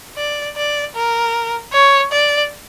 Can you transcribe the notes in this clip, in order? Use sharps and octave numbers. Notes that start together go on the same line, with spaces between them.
D5
D5
A#4
C#5
D5